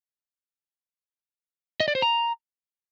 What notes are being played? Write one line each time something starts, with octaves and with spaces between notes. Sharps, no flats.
D#5
D5
C5
A#5